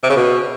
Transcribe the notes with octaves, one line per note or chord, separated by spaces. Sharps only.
C3
C#3
B2